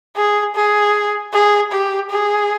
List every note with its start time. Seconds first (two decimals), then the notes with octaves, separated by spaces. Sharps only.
0.16 G#4
0.55 G#4
1.33 G#4
1.72 G4
2.11 G#4